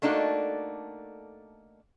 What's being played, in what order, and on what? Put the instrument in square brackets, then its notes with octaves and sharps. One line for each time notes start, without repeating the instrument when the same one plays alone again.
[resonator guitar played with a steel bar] A3 A#3 D4 D#4 F#4 A4